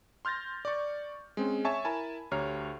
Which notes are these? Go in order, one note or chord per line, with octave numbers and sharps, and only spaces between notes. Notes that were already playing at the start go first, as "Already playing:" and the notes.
C6 F6 G6 A6 A#6
D5 C#6
G#3 C4 C#4
C#5 E5 G#5 A5 C#6 G#6
E4 A#4 G#5 A5 B5
D2 G4 C#5 A#5 F6 C7